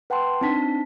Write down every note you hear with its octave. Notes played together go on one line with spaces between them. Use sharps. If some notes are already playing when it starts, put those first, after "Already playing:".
B4 F#5 G5 A5 C6
C4 D4 D#4 A5 B6